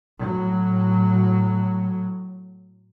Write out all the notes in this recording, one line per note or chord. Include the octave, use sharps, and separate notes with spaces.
A2 F#3